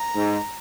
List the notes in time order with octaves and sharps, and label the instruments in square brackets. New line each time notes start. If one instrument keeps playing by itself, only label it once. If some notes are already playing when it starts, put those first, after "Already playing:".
Already playing: [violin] A#5
[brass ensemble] G#2